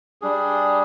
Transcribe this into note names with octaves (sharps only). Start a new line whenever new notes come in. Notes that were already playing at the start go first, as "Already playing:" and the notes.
G3 D4 G#4